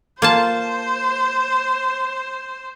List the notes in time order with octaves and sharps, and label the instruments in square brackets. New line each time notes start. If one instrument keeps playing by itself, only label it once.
[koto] A#3 F4 A5 [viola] C5